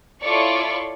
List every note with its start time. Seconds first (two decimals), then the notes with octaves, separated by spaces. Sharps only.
0.22 E4 F4 A4 C#5 D5 C#6